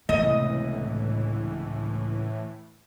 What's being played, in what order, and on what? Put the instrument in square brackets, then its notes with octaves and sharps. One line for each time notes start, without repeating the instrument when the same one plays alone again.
[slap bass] C#2 A3 B3 [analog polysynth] A2 E3 [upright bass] C3 [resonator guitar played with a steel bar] D#5